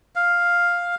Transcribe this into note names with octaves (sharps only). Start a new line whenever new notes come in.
F5